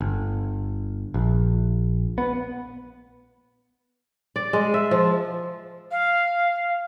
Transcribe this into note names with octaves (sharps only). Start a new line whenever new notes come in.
G1
A#1
B3
D5
G#3
E5
F3
F5